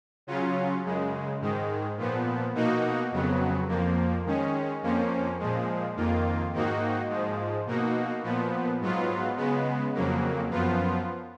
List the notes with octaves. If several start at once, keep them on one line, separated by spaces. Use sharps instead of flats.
C#3 F#3 C#4 F4
F#2 C#3 G#3
G#2 D#3 G#3
A#2 F3 B3
B2 A#3 D#4 F#4
F2 C#3 F#3 B3
F2 F3 A#3
D#3 G#3 C#4
F2 F3 A#3 C#4
A#2 F3 G#3
F2 D#3 A#3 F4
G#2 D#3 A#3 D#4 F#4
G#2 F3 G#3
B2 A#3 D#4 F#4
A#2 F3 B3
G#2 F#3 B3 F4
C#3 G#3 B3
F2 C#3 F#3 A#3
F#2 F3 B3 F4